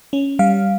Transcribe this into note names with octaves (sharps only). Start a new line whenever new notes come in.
C#4
G3 F5